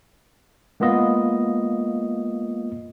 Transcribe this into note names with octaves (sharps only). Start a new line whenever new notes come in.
G#3 A#3 B3 F4 D#5